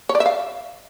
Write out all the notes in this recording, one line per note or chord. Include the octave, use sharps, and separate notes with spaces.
C#5
D5
E5
F5